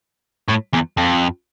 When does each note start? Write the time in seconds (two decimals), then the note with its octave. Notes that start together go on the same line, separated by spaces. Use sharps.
0.48 A2
0.73 E2
0.97 F2